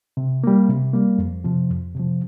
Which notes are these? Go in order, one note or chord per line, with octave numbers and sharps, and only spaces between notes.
C3
G3 A#3
C3
G3 A#3
F2
C3 F3
F2
C3 F3